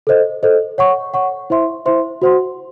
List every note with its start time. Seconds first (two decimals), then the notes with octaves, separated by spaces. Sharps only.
0.07 A4 C5 D#5
0.43 A4 C5 D#5
0.78 C#5 F#5 C#6
1.14 C#5 F#5 C#6
1.50 E4 C5 E5 C6
1.86 E4 C5 E5 C6
2.22 F#4 C5 F#5 C6